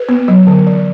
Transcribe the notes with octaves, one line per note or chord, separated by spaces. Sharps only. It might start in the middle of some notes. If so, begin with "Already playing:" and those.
Already playing: B4
B3
F#3
D3
E3